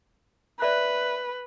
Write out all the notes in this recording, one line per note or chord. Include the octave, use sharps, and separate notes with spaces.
B4 D5 E5 F#6